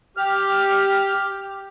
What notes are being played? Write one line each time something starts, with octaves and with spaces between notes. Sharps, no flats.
G4 F6